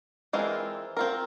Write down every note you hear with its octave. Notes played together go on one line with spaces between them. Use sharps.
E3 G#3 C4 F4 A#4
C4 F4 A#4